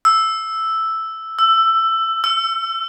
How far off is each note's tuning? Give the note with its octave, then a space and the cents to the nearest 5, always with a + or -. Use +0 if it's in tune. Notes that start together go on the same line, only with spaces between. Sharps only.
E6 +0
E6 +15
E6 +35